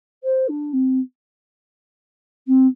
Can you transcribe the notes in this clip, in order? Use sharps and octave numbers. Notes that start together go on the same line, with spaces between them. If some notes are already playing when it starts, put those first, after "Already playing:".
C5
D4
C4
C4